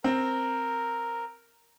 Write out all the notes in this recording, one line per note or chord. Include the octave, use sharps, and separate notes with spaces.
C4 A#4